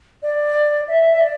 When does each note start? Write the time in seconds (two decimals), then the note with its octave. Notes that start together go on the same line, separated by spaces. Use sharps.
0.23 D5
0.88 E5
1.11 E5
1.20 D5